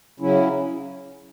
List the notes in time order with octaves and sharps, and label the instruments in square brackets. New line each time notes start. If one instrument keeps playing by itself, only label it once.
[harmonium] C#3 F#3 C#4 E4